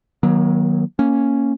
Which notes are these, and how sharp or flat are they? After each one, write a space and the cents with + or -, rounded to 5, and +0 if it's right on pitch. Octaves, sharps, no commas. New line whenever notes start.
D#3 +0 F#3 +0 A#3 +45
A#3 +0 C#4 +0